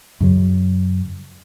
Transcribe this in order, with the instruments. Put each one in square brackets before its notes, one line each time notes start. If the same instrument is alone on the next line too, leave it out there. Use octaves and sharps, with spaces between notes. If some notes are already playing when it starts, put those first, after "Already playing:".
[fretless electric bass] F#2 C#3 F#3